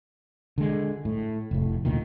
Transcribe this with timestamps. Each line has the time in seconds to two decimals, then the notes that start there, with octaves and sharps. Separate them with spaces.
0.58 D3 G#3
1.05 A2
1.51 F1 A2
1.85 D2 A#2 D#3